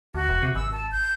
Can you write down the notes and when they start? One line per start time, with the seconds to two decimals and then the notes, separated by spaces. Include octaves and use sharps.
0.14 D2 F#4
0.29 E1
0.43 C3
0.55 G#1 E6
0.72 A5
0.92 G6